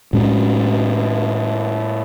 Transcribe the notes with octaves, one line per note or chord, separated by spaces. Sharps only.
A2 G#3 C#4